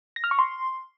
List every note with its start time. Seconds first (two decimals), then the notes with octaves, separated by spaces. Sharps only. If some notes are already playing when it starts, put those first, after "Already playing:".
0.16 A#6
0.24 F6
0.31 C#6
0.39 C6